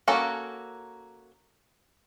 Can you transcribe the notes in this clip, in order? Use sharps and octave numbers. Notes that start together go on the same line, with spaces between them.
A#3 C#4 F#4 A4 A#4